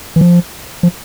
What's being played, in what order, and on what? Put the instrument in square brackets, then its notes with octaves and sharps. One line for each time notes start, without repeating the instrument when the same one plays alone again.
[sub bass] E3
F3
F3